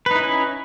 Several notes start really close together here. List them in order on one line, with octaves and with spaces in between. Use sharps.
B4 D#4 E4 C#4